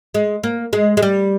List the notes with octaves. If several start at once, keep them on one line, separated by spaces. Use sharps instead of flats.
G#3
A#3
G#3
G#3
G3